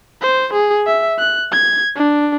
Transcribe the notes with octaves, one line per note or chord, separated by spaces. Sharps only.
C5
G#4
E5
F#6
G#6
D4